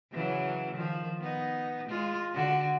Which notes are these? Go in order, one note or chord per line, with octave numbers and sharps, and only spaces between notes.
C#3 E3 F#3
D#3 F3
B3 D#4
G#3 F4
D3 F#4